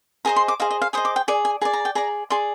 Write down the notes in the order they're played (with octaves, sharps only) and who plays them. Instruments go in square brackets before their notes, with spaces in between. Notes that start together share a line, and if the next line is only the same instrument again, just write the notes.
[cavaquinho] G#4 C5 D#5 A#5
C6
D6
G#4 C5 D#5 F5
D#5
F5
G#4 C5 D#5 D#6
D6
G5
G#4 D5 G#5
G#5
G#4 A#5
D5
A#5
G5
G#4 D5 A#5
G#4 D5 C6